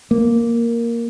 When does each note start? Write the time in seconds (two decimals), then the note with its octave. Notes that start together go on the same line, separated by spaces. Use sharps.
0.11 A#3